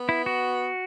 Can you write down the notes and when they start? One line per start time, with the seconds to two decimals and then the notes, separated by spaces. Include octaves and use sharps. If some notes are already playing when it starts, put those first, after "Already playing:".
Already playing: B3
0.09 E4
0.26 F#4